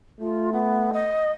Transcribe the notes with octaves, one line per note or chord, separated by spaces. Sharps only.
A3 F4
B3
D#5